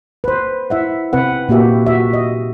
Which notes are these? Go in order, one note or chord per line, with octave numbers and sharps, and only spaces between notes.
B4 C5
E4 E5 F#5
C3 C4 B4 F#5
A#2 A#3 F#4 G4 E5
F#4 E5
D#5